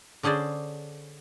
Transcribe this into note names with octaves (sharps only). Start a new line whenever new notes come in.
D3 C#4 G#4 C5 D5